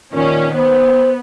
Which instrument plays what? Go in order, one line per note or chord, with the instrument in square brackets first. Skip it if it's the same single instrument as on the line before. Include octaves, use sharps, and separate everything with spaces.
[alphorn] A#2 [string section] D#3 C#4
[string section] B3 [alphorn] C5